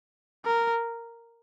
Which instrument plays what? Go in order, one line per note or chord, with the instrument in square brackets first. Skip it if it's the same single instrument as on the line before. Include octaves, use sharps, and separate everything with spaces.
[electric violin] A#4